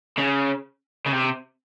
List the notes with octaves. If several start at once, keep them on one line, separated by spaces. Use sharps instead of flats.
C#3
C#3
C3